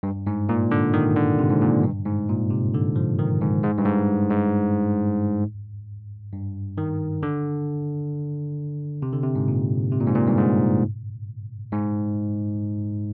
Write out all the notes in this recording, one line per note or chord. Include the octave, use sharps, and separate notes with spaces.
G2
G#2
A#2
D3
D#3
D3
C3
G#2
A#2
G2
G#2
A#2
C3
D3
F3
D#3
G#2
G#2
G2
G#2
G#2
G2
D#3
D3
C3
D3
C3
G#2
A#2
C3
A#2
G#2
A#2
G2
G#2
G#2